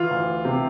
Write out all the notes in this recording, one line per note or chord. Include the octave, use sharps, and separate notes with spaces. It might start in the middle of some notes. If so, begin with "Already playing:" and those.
Already playing: E3 F4
D2
C3